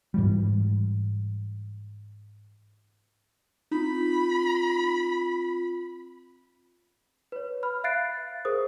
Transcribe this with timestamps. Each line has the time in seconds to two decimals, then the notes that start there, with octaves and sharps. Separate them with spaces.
0.14 G#2 E3 G3
3.71 C4 D#4 F4 B5
7.32 B4 C#5
7.63 B5 F6
7.84 E5 F5 F#6 A6 C7 D7
8.45 G#4 A#4 C5 D#6